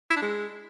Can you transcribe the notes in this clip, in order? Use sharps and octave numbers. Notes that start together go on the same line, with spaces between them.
E4
D4
G#3